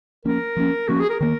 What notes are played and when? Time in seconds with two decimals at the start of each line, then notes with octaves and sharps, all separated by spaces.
0.25 F3 A#3 C#4 A#4
0.57 F3 A#3 C#4
0.88 F3 A#3 C#4 F#4
1.00 G#4
1.10 A#4
1.20 D#3 A#3 A#4